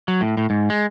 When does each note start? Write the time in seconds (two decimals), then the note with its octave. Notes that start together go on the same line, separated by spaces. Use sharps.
0.08 F#3
0.21 A2
0.37 A2
0.50 G#2
0.70 G#3